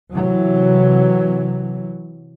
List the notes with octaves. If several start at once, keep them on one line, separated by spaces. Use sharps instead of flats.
C3 E3 F#3